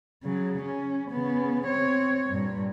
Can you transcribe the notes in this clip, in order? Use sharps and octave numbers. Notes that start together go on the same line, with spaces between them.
C#3 F#3
C#4
C#3 B3
C4 C#5
G2 A#2